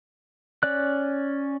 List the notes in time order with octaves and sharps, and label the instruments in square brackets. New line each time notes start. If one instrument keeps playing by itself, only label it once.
[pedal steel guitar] C#4 D5 F#6